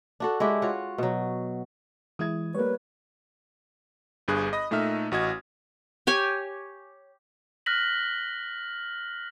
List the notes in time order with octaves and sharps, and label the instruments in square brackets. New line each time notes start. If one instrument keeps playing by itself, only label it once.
[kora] D4 F#4 A4
G#3 D4 E4 G4
F4 F#4 C#5
B2 F#3
[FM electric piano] E3 G#3 E4 [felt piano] D#6 G#6
[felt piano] G3 A#3 [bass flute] B4 [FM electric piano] C#5
[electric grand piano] G1 G2 G#4 F#6
D#5 B5 D#6 A#6
A#2 A3 D#4 E5 F6
A1 F#4 D#5 G#6
[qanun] G4 C#5 G#5
[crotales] F6 F#6 A#6 B6 F#7